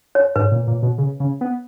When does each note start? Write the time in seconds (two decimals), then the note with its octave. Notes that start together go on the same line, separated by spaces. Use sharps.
0.15 C#5
0.36 G#2 B4
0.52 A#2
0.67 A#2
0.83 B2
0.98 C#3
1.20 C#3
1.41 B3